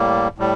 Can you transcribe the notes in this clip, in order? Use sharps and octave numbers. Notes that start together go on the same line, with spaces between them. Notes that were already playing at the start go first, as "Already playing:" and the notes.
Already playing: A2 G3 A#3
A2 G3